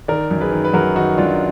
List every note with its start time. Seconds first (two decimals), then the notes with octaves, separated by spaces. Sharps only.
0.08 D#3 A#4 D5
0.31 F#2
0.41 G#4 B4
0.52 D#3
0.64 B4
0.74 F#2 F#4 A#4
0.95 D#3 D#4 F#4
1.18 F#2 D4 F4